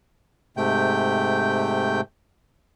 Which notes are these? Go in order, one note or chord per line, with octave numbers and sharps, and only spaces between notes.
G#2 C3 A3 G5 G6